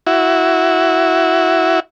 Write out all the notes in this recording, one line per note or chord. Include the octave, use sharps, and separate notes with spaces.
E4 F#4